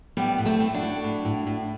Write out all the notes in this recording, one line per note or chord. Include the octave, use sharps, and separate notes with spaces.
A2 G3 B3
A2
A3 C4
A2
D4 F#4
A2
A2
A2
A2